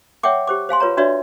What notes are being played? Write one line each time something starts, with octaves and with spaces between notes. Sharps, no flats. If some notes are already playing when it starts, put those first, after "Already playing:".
C#5 E5 F#5 G5 D6
G4 C5 D6
C5 F5 G#5 C6
F4 B4 C#5 A#5
D4 F#4 B4 C#5 D5 E5